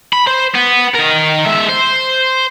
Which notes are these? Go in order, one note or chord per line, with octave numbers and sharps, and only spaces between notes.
B5
C5
B3
D#3 A#4
G#3 E5
C5